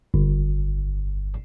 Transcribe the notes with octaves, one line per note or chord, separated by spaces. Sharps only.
G1